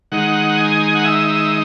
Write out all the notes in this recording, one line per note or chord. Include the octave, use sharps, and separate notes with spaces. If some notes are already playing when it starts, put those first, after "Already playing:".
D#3 G#3 D#4 F#5
G#5
F#5
E5
E5